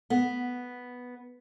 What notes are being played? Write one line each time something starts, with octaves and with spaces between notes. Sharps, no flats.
B3